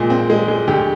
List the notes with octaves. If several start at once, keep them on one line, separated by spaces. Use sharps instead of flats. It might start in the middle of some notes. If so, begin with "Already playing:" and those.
Already playing: A#1 A#2 G#3
C4
G#3
G#3
D2 G4